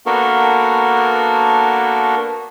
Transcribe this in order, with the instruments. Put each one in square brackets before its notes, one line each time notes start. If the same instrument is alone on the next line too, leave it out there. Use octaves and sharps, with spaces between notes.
[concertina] A#3 B3 D4 F#4 A4 A#4